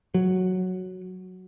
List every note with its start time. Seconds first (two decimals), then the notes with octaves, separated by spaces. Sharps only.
0.14 F#3